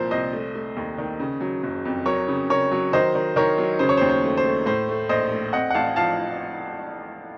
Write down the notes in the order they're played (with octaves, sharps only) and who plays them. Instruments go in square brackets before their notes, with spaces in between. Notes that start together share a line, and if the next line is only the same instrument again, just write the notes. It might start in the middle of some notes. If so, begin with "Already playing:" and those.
Already playing: [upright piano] C2 A#2 F3 A#4 C5
C2 C5 D#5
A3
A3
D#2
D#3
C#3
F#3
F#1
F2
F#3 A#4 C#5
C#3
C#3 A#4 C#5
F#3
D#3 C5 D#5
D#3
D#3 A#4 C#5
F#3
C#3 C5
C#5
C5
D#2
C5
A3
C5
A3
A2 C5
A3
A#1 C5 D#5
A3
C4 D#5 F#5
F#5
A1 F5 A5
F3 F5 A5